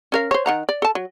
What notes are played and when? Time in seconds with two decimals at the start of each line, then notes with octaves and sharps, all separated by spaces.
0.12 C#4 A#4 F5
0.31 C5 C#5
0.46 D#3 F#5 A#5
0.69 D5
0.82 A4 A5
0.95 F#3